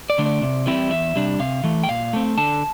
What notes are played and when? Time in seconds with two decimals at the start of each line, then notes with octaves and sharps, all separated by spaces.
0.10 D5
0.18 D3 A3 D4
0.26 D5
0.42 C3
0.66 E3 G3 C4 E4
0.91 E2 E5
1.15 C3 G3 D4
1.39 C3 F5
1.64 E3 A3
1.84 G5
1.89 A#2 F5
2.13 A3 C4
2.37 D3 A5